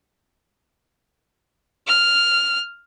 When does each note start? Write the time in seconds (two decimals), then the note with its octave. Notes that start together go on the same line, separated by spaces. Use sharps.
1.87 F6